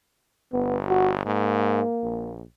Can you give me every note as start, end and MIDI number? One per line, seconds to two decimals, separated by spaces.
0.52 1.23 31
0.52 0.76 59
0.88 1.11 66
1.26 1.82 44
1.26 2.31 58
2.03 2.43 34